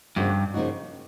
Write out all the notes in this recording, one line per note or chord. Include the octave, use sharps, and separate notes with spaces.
G2 C#3 F3 A#3 D#4 F#4
C#3 F3 A#3 D#4 F#4